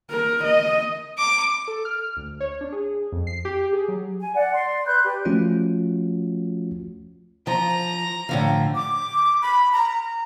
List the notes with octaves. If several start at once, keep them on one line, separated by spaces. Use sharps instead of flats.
A#4
D#5
D6
A4
F6
D2
C#5
D4
G#4
F2
C7
G4
G#4
F#3
G#5
D5 F#5
D5 C6
B4 B5 F#6 G6
G4 B4 D5
F3 A3 C#4 F4 F#4
F3 A#5
A2 D3 F3
D6
B5
A#5